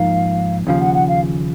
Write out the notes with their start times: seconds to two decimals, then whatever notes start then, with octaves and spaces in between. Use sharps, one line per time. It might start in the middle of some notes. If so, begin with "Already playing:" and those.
Already playing: G#2 F3 A#3 D#4 F5
0.67 D#2 C#3 F3 F5
0.81 F#5
0.94 F#5
1.08 F5